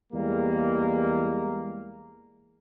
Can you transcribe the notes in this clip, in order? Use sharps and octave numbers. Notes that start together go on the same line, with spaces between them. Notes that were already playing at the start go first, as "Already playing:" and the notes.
E2 G3 G#3 A#3